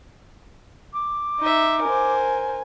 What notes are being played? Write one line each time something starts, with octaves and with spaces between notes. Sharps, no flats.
D6
D#4 E5
A#4 C5 G#5